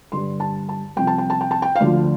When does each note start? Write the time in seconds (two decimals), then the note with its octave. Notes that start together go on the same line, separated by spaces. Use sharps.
0.12 G2 D3 G3 C6
0.40 A5
0.69 A5
0.96 C2 C3 F3 G5
1.07 A5
1.18 G5
1.30 A5
1.41 G5
1.51 A5
1.62 G5
1.76 F5
1.80 D2 D3 F3 D5